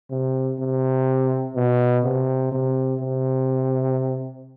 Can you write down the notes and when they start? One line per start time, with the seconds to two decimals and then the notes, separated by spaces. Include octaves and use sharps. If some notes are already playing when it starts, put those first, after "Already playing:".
0.11 C3
0.59 C3
1.56 B2
2.04 C3
2.52 C3
3.01 C3